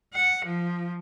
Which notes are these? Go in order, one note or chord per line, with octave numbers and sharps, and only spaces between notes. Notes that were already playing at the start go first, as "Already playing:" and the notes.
F#5
F3